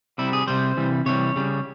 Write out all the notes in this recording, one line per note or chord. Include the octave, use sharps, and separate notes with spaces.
C3 G3 E4
G#4
C3 G3 C5
C3 E3 G3
C3 E3 G3 C#5
C#3 G3